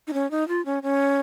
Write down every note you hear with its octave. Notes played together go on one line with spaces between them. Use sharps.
D#4
C#4
D#4
F4
C#4
C#4